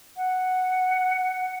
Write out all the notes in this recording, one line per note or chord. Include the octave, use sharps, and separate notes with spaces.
F#5